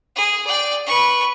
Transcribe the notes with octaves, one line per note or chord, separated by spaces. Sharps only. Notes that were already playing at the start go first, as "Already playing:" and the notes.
G#4
D5 G5
B4 C#6